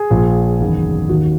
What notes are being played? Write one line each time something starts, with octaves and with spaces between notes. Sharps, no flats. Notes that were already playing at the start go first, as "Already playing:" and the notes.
Already playing: G#4
A#1 A#2
F#1 E2 D#3
D#2 D#3 F#4